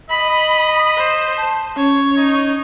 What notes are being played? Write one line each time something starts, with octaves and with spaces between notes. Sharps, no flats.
D#5 B5
C5
A5
C#4 C#5
D#4